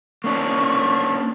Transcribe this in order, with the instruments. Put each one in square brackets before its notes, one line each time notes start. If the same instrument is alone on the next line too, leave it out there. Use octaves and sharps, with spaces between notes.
[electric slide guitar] A#3 C#4 D4 [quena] C#6